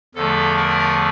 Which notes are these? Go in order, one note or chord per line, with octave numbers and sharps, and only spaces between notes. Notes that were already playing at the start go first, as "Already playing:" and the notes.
E2 D3 F3 A3 A4
A#4